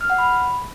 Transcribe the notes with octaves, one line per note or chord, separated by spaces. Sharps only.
F6
F#5
B5